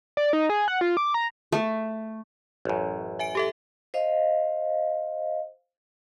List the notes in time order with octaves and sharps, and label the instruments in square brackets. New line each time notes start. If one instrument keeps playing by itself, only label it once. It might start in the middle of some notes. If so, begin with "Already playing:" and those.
[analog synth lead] D5
D#4
G#4
F#5
F4
D6
A#5
[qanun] A3
[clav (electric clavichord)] A1 F#2
[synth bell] E5 G#5 D7
G4 A4 E5
[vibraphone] C5 D#5 F5